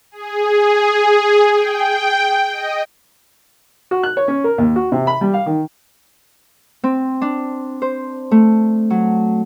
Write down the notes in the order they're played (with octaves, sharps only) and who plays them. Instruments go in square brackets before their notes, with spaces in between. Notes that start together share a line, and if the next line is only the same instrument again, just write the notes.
[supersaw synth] G#4
G5
D#5
[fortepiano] F#4
F#6
C#5
C#4
A#4
D#2
F#4
C3
B5
G3
F5
D#3
[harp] C4
D4
C5
A3
F#3